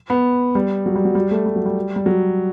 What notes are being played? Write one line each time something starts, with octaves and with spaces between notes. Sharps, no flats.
B3
G3
F#3
G3
F#3
G3
A3
G3
F#3
G3
G3
F#3